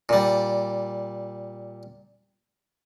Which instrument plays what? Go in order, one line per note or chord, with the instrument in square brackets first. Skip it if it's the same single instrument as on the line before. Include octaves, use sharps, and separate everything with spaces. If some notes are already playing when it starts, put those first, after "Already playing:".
[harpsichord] A#2 G3